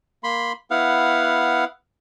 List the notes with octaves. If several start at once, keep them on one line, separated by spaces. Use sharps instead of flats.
A#3 B5 C6
B3 E4 F5 F#5